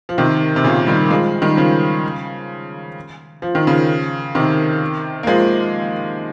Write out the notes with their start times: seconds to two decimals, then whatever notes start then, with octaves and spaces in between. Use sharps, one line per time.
0.09 F3
0.18 C3 D#3
0.56 C3
0.64 A#2 C#3
0.87 D#3 G3
1.10 F3 G#3
1.42 D#3 G3
1.57 C#3 F3
3.42 F3
3.55 D#3
3.67 C#3 F3
4.35 C3 D#3
5.23 A#3
5.27 F3 G#3